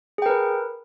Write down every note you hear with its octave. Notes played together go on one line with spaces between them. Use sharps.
G#4 A#4 B4 G5